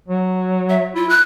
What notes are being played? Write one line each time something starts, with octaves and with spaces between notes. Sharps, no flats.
F#3
E5
E4 F4
F#6